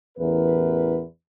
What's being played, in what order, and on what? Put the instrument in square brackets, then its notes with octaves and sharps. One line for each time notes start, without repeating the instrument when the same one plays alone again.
[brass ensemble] A1 E2 A#4 B4